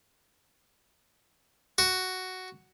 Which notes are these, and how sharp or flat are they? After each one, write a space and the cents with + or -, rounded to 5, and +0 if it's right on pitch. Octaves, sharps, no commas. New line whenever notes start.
F#4 +5